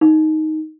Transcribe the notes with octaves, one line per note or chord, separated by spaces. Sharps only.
D#4